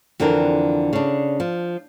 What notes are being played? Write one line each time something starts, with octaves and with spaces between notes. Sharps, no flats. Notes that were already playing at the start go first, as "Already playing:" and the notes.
F2 D3 E3 C4 D4 A#4
C#3 D4
F3